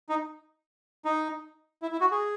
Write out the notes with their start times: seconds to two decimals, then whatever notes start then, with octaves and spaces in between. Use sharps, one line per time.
0.09 D#4
1.05 D#4
1.82 E4
1.92 E4
2.01 F#4
2.12 G#4